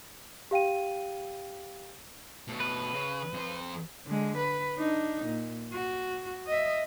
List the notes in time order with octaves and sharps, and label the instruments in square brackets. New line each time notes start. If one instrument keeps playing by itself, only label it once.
[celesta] G4 F5 G5 D#7
[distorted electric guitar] B2 A3
[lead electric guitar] B4
[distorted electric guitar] C#3
F2 C5
[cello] D3 G#3
B4
D4 D#4
A#2
F#4
D#5 E5